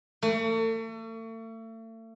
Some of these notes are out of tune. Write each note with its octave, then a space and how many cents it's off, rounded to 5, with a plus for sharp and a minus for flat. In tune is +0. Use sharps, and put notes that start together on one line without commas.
A3 +40